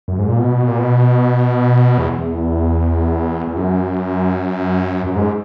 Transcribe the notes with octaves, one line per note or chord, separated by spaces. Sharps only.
F#2
G#2
A#2
B2
A#2
B2
E2
E2
E2
F#2
F#2
G#2